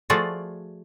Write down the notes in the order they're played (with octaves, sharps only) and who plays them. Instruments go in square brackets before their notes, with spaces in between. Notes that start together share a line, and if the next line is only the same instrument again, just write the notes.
[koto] F3 A3 F4 F#4 G#4 D5